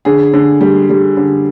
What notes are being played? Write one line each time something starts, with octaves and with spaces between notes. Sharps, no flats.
D3 G#4
D3
G3
G3
D3